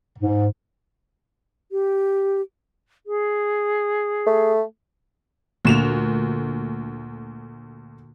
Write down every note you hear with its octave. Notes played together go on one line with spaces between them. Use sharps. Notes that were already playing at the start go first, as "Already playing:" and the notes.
G#2
G4
G#4
A3
D2 A#2 D3 A#3 E7 F7